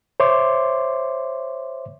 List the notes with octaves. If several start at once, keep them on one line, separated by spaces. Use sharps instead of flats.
C5 C#5 E5 C6 D6